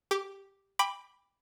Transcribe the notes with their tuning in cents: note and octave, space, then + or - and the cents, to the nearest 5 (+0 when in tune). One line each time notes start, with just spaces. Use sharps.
G4 +0 D6 -20
G5 +30 B5 +0 D6 +0